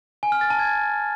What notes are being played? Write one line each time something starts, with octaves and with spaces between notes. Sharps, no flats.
G#5
F6
A6
A5
G#6